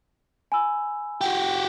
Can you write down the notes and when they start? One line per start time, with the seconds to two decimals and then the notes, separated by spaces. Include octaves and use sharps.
0.52 G#5 B5 E6
1.21 F#4 G4